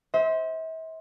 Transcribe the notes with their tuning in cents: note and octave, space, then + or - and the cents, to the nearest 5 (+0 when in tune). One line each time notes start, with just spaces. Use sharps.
C5 +0 E5 -40